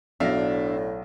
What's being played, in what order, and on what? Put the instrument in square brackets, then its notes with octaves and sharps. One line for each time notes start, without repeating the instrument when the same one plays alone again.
[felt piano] B1 F#3 A#6 [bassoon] A2 [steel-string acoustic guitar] D4 [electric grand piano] E5 F5